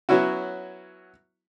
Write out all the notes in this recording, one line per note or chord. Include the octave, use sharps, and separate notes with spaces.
F#3 B3 C#4 E4 F#4